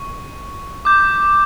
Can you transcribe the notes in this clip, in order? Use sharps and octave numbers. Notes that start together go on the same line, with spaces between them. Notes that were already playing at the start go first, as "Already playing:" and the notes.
Already playing: C#6
D6 G6